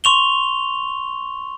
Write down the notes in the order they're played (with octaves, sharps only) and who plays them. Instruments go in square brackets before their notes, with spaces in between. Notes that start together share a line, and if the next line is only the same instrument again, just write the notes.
[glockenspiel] C6 C#6 F7 G7